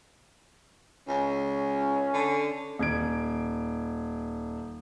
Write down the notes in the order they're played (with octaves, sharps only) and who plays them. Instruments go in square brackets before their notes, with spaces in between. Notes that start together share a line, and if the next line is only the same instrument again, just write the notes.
[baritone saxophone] C#2 [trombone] C#4
[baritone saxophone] D3
[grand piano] D#1 G#6 D7